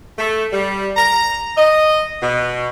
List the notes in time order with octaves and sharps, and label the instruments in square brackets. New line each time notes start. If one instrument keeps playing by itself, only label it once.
[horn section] A3
G3
A#5
D#5
B2